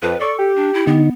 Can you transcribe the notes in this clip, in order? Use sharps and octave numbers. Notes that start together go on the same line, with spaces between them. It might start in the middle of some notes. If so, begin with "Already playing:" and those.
F2 B4
A4 D5 C#6
G4
D4
E4
D3 B3 D#4